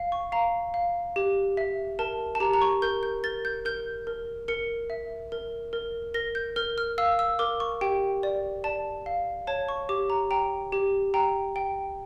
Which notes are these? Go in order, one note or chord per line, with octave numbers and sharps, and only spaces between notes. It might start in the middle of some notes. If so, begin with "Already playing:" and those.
Already playing: F5
C#6
F5 A#5
F5
G4
E5
A#4 A5
A5
G4 A#5
A#5
C#6
A#4 G6
G6
A#4 A6
G6
A#4 G6
A#4
A#4 C#7
E5
A#4
A#4
A#4 A#6
G6
A#4 F6
F6
F5 E6
E6
A#4 D6
C#6
G4 G5
D5
D5 A5
F5
C#5 A5
C#6
G4 D6
A#5
G5 A#5
G4
G5 A#5
G5